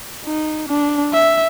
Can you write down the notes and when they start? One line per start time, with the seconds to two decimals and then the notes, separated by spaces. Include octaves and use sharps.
0.25 D#4
0.68 D4
1.13 E5